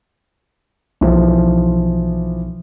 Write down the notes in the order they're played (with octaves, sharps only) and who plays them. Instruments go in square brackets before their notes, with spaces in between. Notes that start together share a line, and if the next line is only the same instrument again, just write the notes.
[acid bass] B1 [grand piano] E3 F3